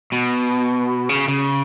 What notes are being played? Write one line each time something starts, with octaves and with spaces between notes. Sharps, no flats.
B2
C#3
C#3